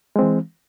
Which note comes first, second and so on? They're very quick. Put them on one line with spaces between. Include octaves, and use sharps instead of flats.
G#3 C4 E3